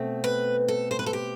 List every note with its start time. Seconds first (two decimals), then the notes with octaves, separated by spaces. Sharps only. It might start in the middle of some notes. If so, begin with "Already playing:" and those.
Already playing: B2 A3 C4
0.24 B4
0.68 A4
0.91 C5
0.99 B4
1.06 A4
1.13 G4